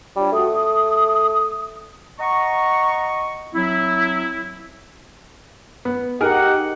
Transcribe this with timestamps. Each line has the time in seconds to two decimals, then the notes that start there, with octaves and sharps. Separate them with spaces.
0.16 G3 D4 F4 C#5
0.32 A3 F#4 D#6
0.52 D#6
2.19 D#5 F#5 A#5 C#6
3.53 F#3 C4 E4
5.85 B3
6.21 D#4 G4 G#4 A#4 F#5